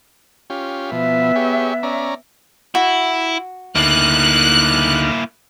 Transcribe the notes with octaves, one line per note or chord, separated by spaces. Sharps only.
C#4 F4 G4
B2 F3 B3 E5
G4 G#4 C#5
C#4 D5 A#5
E4 F#4
D2 A#3 D#4 E4 F6 F#6